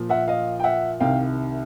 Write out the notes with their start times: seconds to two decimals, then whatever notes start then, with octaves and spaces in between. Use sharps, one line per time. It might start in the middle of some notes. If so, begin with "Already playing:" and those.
Already playing: A#2 F3 A#3
0.09 E5 F#5
0.28 D#5 F5
0.60 G5
0.64 E5 F#5
1.00 C2 C3 D#3 F5 G5